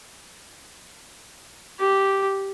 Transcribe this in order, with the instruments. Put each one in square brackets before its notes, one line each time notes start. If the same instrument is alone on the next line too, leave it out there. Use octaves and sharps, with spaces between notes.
[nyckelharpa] G4